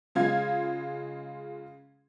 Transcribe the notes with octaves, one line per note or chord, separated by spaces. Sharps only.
C#3 G#3 F4 F5 G#6